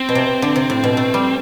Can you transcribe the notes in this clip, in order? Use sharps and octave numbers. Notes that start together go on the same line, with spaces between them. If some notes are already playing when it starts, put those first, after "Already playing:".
Already playing: C4
B2
C3
D3
C3
A2
B2
A3
G3